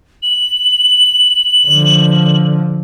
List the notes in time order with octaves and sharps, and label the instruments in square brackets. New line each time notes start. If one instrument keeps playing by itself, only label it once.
[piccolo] F#7
[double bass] D3 F3